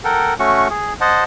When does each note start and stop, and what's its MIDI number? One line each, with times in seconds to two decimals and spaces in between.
0.04 0.34 69
0.04 0.34 70
0.04 0.34 78
0.04 0.34 79
0.39 0.68 57
0.39 0.68 61
0.39 0.68 66
0.39 0.68 85
0.70 0.93 68
1.01 1.24 72
1.01 1.24 75
1.01 1.24 78
1.01 1.24 81